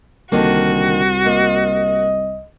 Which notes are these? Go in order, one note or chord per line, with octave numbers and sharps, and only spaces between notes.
C2 D3 D#3 A#3 F#4
A#3 D#5